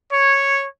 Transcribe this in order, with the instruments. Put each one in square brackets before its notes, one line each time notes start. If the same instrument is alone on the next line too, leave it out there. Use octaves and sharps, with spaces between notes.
[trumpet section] C#5